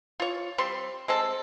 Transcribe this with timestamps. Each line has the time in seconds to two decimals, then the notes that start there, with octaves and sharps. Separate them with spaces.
0.20 F4 C#5
0.58 G3 C4 C6
1.08 G#3 C4 A4